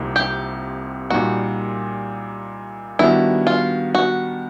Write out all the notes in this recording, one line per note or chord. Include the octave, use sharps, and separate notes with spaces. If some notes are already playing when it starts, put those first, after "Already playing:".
Already playing: C2 C3 F3 A#3 D#4
G4
A#2 G3 A#3 D#4 F#4
D#3 G3 B3 D4 E4 F#4
F4
F#4